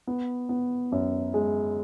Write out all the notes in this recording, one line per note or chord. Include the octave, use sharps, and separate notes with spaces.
B3
B3
F#2
G#3